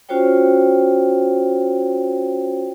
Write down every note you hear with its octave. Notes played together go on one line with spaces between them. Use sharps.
C#4 F4 F#4 C5 C#5 G5